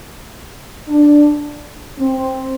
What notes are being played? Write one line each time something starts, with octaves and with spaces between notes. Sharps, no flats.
D4
C4